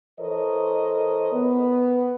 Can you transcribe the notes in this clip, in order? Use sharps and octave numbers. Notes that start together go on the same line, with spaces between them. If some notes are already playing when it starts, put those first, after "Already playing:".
E3 A4 A#4 C5 C#5 D#5
B3